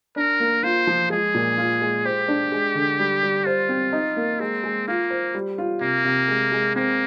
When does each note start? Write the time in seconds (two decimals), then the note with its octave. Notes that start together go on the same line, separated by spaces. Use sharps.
0.16 D4 A#4
0.40 A#3
0.63 F4 C5
0.87 F3
1.10 G#3 G#4
1.35 A#2
1.58 F4
1.81 G#3
2.05 G4 C5
2.28 D4
2.52 G#3
2.75 D3
3.00 G3
3.23 G3
3.46 F4 C5
3.69 C4
3.93 D#4
4.17 A#3
4.40 G#3 C4
4.64 G#3
4.88 A#3 F4
5.11 C5
5.35 G3
5.58 F4
5.81 C3 A#3
6.05 C3
6.28 G#3
6.52 G#3
6.76 A#3 C4